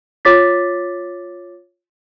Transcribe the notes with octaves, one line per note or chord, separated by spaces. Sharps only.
F4 C#5 D6 A6 B6